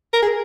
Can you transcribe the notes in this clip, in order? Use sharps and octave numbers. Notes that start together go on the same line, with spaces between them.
A#4
G#4